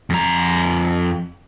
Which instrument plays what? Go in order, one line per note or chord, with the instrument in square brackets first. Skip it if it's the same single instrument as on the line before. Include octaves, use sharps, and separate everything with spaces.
[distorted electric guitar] F2 A#5